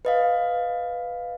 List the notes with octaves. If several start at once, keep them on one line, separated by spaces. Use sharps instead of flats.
B4 D#5 F5